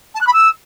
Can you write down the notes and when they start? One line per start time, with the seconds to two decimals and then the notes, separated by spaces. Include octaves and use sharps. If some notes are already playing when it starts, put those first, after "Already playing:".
0.15 A5
0.21 F#6
0.27 B5
0.33 E6